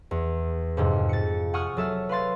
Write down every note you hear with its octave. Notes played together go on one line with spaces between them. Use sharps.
E2
F2 G#2 C3
A6 C#7
F#5 G#5 C#6 D#6 F6
F#3 A4 E5 F6
B4 F5 C6 A6